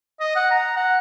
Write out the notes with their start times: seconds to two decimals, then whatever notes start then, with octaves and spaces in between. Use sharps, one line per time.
0.20 D#5
0.36 F#5
0.51 A#5
0.76 F#5